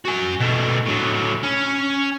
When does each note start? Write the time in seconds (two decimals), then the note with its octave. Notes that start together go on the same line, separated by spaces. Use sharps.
0.05 F#4 G#5
0.41 B2 A3
0.86 A2 F#3
1.44 C#4